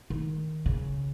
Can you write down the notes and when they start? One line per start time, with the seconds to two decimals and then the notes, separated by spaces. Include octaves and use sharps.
0.10 D#3
0.66 C#3